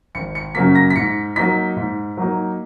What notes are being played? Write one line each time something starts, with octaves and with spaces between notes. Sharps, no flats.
G#1 C#7
C#7
F#2 C#3 F#3 A#3 B6
A#6
B6
G#2 C#7
F#3 A#3 D#4 B6
G#2
F#3 A#3 D#4